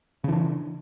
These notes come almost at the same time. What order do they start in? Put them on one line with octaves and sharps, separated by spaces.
C#3 E3 D4